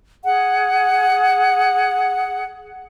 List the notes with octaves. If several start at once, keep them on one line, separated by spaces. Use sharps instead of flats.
G#4 F#5